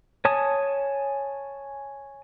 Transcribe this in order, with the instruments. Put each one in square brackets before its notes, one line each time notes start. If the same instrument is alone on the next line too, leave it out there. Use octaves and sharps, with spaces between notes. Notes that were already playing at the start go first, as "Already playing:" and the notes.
[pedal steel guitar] C#5 G#5 A5 D#6